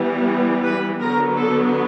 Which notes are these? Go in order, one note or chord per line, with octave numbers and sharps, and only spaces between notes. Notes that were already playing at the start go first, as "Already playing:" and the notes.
Already playing: E3 G3 B3
B4
D3 F#3 B3 A#4
A4